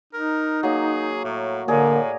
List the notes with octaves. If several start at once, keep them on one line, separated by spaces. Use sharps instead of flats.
D#4 A#4
F#3 A#3 G#4
A2
A2 D3 A#3 G#4 D5 A#5